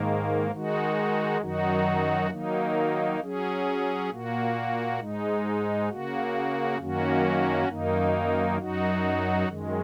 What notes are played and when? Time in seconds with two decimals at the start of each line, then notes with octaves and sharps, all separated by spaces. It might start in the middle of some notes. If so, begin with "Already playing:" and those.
Already playing: G#2 D#3 A#3
0.51 D#3 G#3 D#4 F#4
1.41 F#2 D#3 F#3 D#4 F#4
2.30 D#3 F#3 A#3 D#4
3.20 F#3 C#4 G#4
4.10 A#2 A#3 F#4
4.99 G#2 G#3 D#4
5.89 C#3 A#3 F#4
6.79 F#2 D#3 A#3 C#4 F#4
7.68 F#2 D#3 A#3 D#4
8.59 F#2 F#3 D#4 F#4
9.48 F#2 D#3 G#3